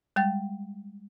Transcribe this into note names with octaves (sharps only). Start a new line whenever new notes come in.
G3 G#3 G5 A6